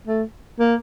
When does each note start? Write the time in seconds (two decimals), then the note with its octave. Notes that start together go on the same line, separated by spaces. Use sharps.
0.07 A3
0.60 A#3